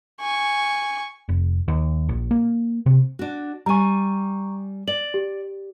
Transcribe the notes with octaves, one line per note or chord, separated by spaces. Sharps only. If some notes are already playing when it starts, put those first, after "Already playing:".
G#5 C#6
F1
D#2
A#1
A#3
C3
D4 F#4
G3 G#5 A#5 C#6
D5 F#7
G4